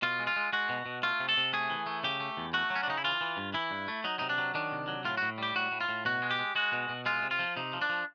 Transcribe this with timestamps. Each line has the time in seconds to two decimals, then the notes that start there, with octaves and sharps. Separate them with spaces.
0.02 B2 F4
0.19 G#3
0.27 F4
0.36 G#3
0.53 G#3 F#4
0.69 B2
0.86 B2
1.03 A3 F4
1.20 C3
1.29 A4
1.37 C3
1.53 A3 G#4
1.70 E3
1.86 A3
2.04 C#3 G4
2.20 A3
2.37 E2
2.53 A3 F#4
2.70 F#3
2.76 C#4
2.83 D4
2.88 C#3 D#4
2.98 E4
3.04 E3 F4
3.21 E3
3.37 G2
3.54 E3 E4
3.71 G2
3.88 A3
4.04 F#3 D#4
4.19 C3 D#4
4.29 D4
4.38 F#3
4.54 D#3 D4
4.72 C3
4.88 F#3
5.05 A2 F4
5.17 A2 F#4
5.38 G3 G4
5.55 A2 F#4
5.72 A2
5.81 F4
5.89 A2
6.05 B2 F#4
6.22 G#3
6.31 G4
6.39 G#3
6.55 G#3 F#4
6.73 B2
6.89 B2
7.06 G#3 F4
7.23 C3
7.31 F4
7.39 F3
7.57 C3 D#4
7.73 F3
7.82 D4
7.89 F3